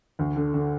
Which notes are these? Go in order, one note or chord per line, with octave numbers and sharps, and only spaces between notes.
D2
D3
D3